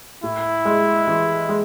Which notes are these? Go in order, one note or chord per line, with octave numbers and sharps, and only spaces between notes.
A2 E4
G#3
E3
G#3